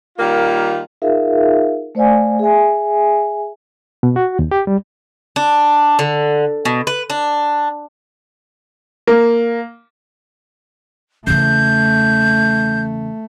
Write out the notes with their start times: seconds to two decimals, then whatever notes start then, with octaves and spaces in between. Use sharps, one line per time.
0.19 D#3 G3 A#3 F4
1.02 D#4 F4 G#4 A#4 E5 F5
1.95 A3 C5 D5 F5 G#5
2.39 G#4 E5 G#5
4.03 B2
4.16 F#4
4.39 D#2
4.51 G4
4.67 G3
5.36 D4
5.99 D3
6.65 B2
6.87 B4
7.10 D4
9.07 A#3
11.27 E2 C#3 A3 G6